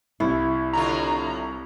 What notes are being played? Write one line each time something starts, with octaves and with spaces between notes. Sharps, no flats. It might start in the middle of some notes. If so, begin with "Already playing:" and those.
C2 E4
A2 D3 F4 A#5